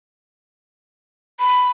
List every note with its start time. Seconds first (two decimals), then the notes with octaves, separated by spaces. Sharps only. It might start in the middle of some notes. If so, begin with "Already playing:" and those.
1.39 B5